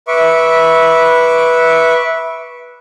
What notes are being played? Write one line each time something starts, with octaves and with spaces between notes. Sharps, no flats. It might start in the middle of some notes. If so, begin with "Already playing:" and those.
B4 E5 C#6 D6